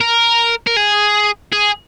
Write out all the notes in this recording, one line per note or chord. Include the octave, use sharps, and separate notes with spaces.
A#4
A#4
G#4
G#4